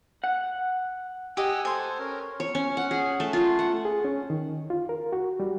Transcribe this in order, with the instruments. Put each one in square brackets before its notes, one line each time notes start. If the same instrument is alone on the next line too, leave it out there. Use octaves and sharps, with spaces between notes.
[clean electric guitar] F#5
[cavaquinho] G4 D#5 [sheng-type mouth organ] F#5 G#5 E6
[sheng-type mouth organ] A4 C5 [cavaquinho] G#5 C6
[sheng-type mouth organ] C#4 A#4
[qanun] C#5
C#4
F#5
G#4
A3
F4
F#5
[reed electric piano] G#4
C#4
D#3
F4
A#4
F#4
G3